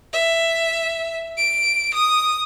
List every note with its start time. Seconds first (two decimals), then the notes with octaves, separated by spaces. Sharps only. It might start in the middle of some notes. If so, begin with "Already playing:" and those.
0.13 E5
1.37 D7
1.94 D#6